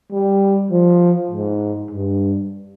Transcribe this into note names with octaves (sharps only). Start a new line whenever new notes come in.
G3
F3
G#2
G2